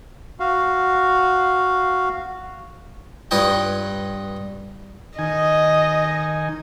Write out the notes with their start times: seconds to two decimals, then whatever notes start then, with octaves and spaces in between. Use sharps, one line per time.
0.40 F#4 F5
3.31 G2 F4 B4 C#5 D#5 G5
5.18 D#3 D#5 G#5